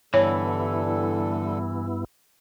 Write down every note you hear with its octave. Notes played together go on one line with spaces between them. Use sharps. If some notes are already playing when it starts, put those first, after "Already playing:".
G2 D3 E3 G3 B3 E4 A4 C#5